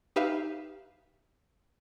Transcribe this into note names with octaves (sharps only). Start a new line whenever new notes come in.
D#4 G4 B4 E5 F5